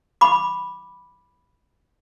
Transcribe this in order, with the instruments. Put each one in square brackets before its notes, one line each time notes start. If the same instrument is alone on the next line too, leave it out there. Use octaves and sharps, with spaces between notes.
[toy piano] B5 D6